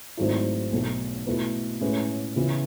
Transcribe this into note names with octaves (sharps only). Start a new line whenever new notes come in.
G#1 G#2 F#3 A3 E4
B1 B2 A3
B2 A3 E4 B4
A2 G#3 C#4 G#4 B4
C#3 E3 B3